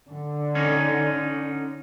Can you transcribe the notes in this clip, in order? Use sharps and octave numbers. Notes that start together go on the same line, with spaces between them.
D3
C#4 D#4